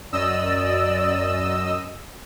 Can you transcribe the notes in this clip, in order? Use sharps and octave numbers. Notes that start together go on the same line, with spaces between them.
F#2 D5 D#5 E6